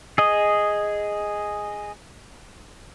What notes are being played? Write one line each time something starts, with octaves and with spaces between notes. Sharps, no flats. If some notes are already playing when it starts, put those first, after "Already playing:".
G#4 D#5